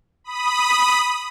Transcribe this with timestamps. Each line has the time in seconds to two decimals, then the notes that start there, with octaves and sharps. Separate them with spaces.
0.24 B5 D#6